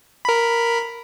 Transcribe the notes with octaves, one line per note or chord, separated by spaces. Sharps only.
A#4 B5